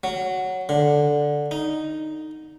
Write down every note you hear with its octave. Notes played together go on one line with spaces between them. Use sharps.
F#3
D3
D#4